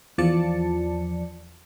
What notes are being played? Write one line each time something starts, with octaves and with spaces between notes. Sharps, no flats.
E2 F3 D5 A5 C#7